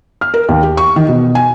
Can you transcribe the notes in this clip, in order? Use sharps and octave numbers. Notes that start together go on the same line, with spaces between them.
F6
A#4
D#2
G4
C#6
D#3
B2
G#5